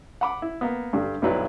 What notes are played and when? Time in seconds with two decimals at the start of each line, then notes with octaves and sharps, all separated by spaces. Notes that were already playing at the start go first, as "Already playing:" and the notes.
0.21 F#5 B5 D6
0.42 E4
0.61 A#3 B3
0.93 G2 D3 G3
1.22 B1 G2 F#3 E4 B4 D5